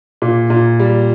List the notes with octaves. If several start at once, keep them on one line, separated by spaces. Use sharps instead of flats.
A#2
A#2
G3